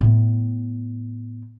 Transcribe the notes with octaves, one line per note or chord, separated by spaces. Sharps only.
A2 B3